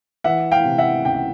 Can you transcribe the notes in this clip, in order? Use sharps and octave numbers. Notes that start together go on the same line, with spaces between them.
E3 E5 F#5
F5 G5
C3
E5 F#5
C#2 G5
F#5